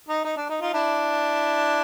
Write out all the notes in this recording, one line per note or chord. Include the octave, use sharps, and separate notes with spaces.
D#4
D#4
D4
D#4
D#4 F4
D4 E4